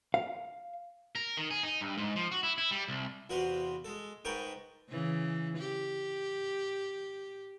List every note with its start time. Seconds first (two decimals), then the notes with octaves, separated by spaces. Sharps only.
0.14 F5
1.15 A#4
1.37 D#3
1.50 G#4
1.63 D#4
1.81 G2
1.98 G#2
2.16 F3
2.31 F#4
2.43 E4
2.58 E4
2.71 G3
2.88 C2
3.30 E2 C3 F#4 B4 F5 C6
3.85 G#3 A4
4.25 G#2 A#4 B4 G5 A5 C#6
4.90 C#3 E3
5.59 G4